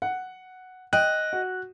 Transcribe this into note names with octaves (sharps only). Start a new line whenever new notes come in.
F#5
D#5 G5 F#6
F#4